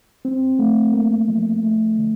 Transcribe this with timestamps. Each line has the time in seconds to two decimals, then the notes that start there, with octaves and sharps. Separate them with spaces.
0.25 C4
0.59 A3
0.94 A#3
1.28 F3
1.63 A3
1.98 D3